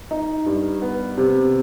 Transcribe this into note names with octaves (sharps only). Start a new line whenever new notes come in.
D#4
G2
B3
C3